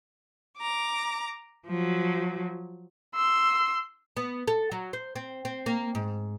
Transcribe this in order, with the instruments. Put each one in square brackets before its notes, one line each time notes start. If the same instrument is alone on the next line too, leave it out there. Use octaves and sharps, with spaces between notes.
[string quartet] A#5 D6
F3 F#3
[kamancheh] C6 E6
[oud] B3
A4
F#3
C5
C4
C4
A#3
G#2